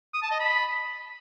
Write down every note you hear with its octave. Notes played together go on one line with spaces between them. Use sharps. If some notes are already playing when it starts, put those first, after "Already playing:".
D#6
A5
D#5
B5